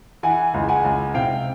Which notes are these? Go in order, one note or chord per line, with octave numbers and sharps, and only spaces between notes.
E3 F#5 G#5
C#2
F#5 G#5
C#2
C3 F5 G5